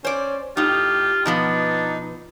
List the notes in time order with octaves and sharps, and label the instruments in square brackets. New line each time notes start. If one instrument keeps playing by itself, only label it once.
[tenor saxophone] C#4 [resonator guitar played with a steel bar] C5 D5
[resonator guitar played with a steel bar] A2 D#4 [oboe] F4 [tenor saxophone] G4
[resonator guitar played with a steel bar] B2 F3 B3 [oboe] D4 [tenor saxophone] D#4